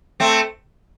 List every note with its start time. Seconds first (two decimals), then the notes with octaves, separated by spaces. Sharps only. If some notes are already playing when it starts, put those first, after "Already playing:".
0.20 A3 C4